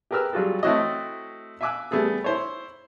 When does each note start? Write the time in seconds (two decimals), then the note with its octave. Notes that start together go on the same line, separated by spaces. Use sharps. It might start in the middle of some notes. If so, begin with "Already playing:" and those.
0.11 G4 G#4 A#4 B4 E6 F6
0.33 F#3 G3 F4 F#4 G#4 A4
0.63 A3 C4 E4 F#4 C#5 D#5
1.61 E5 F5 G#5 D6 E6 F#6
1.91 G3 A3 B3 G#4 A4
2.24 E4 C5 C#5